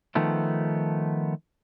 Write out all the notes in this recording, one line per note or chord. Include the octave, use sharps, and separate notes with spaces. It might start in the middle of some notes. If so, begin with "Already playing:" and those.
D#3 F3 A3 B3